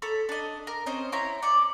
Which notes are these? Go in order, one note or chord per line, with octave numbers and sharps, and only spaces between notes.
A4 C#5 A#5 B5
D4 D#5
A#4
C4 C#4 C5 D#5
E4 C5 C#5 A#5
D5 C#6